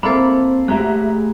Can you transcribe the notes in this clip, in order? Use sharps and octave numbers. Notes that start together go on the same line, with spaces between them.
A#3 C4 E4 A4 C5 B5
A3 G4 G#4 E5 A#5 F#6